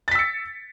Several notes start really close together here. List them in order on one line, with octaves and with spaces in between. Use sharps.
A6 B6 E6 C#7